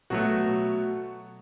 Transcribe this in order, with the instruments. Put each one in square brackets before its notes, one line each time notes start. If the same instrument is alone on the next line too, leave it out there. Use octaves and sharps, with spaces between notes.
[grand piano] B2 F#3 A3 F#4